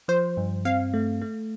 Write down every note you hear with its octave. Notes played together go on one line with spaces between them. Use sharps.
F3 C5
G2
C4 F5
A3
A3